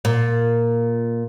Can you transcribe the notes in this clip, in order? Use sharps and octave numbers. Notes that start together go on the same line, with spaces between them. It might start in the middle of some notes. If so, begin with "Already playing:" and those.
A#2